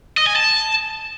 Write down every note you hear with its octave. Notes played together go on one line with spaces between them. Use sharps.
D#5
G#5
A5